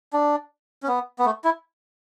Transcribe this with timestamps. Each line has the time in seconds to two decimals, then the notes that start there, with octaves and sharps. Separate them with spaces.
0.13 D4
0.83 C#4
0.88 B3
1.19 B3
1.25 A3
1.44 E4